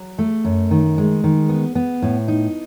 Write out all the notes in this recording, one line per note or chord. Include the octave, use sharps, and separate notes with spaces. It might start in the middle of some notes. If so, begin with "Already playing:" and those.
Already playing: F#3
A3
F#2
D#3
G#3
D#3
B3
B3
A2
D#4